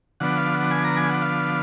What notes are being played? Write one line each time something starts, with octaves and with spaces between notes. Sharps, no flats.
D3 F3 B3 D4 F#5
F5
F#5
G#5
A#5
G#5
F#5
F5